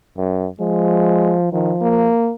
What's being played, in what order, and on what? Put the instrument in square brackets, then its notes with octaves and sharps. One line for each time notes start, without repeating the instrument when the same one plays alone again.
[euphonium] F#2
[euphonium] F3 [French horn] G#3
[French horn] D#3 [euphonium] F3
[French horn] A#3